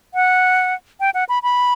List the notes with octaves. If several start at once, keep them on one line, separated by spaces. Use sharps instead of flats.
F#5
G5
F#5
B5
B5